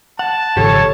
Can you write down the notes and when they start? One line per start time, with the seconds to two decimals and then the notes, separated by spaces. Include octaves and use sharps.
0.19 F#5 A5
0.57 G#1 C#3 F3 G4 A4 C#5